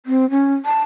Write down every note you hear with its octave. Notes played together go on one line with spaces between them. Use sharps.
C4
C#4
A5